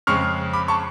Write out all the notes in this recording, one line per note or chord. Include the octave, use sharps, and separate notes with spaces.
F2 C#3 G#3 C#6 F6
B5 D6
A5 C#6